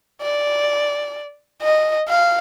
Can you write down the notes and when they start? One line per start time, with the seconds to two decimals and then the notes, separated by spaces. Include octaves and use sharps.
0.21 D5
1.62 D#5
2.09 F5